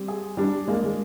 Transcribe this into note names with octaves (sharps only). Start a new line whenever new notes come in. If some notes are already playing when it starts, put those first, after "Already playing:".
Already playing: G3 C4
G#4
G3 D4
G#3 A#3
G#3